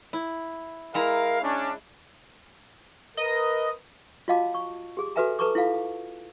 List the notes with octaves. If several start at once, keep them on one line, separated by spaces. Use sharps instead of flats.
E4
G#3 E4 A#4 F5 A#5
C#4 D4
A#4 B4 D#5
F4 F#4 D#5 F5 A5 D6
C#6
G4 G#4 D6
F#4 A4 B4 E5 G#5 A#5
A4 B4 A5 A#5 C#6 D6
E4 F4 A4 F5